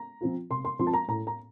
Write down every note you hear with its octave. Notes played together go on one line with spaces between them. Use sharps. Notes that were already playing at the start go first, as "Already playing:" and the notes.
Already playing: A#5
F3 C4 F4
C3 C6
C6
F3 C4 F4 C6
A5
A#5
A2 A#5
A#5